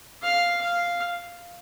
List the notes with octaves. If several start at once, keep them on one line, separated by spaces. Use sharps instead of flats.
F5
F5